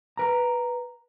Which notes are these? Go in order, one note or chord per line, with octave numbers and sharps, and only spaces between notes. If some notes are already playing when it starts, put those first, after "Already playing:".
B4 A#5